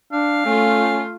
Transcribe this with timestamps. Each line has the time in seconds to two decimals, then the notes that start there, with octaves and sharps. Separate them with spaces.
0.13 D4 F5
0.45 A3 C#4 F4